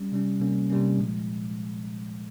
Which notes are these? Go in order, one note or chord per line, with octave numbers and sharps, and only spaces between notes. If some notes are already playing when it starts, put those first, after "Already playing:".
Already playing: G3 C#4
C3 G3 C#4
C3 G3 A#3 C#4
C3 G3 A#3 C#4
A#2 F3 G#3